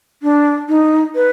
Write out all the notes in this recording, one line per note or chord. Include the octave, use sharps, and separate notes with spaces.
D4
D#4
B4